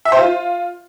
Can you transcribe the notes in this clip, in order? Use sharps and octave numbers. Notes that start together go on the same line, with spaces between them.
E5
C5
F4